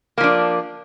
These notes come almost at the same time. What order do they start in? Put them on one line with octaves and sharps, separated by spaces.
A#3 F3 D4